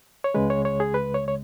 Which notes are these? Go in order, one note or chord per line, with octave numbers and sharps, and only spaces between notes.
C#5
C#2 C#3 G#3 B4
C#5
C#5
G#4
B4
C#5
C#5